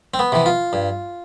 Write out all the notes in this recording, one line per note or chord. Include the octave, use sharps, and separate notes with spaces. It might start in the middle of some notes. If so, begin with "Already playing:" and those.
C4
B3
C3 E3
F4
G2